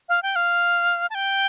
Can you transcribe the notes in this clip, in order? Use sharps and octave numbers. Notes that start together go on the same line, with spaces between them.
F5
G5
F5
A5
G5